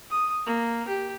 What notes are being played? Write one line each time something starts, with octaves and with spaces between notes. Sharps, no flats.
D#6
A#3
G4